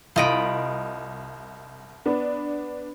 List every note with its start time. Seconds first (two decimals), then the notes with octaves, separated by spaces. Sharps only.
0.16 C2 F4 D#5 B5 D7
2.06 B3 D4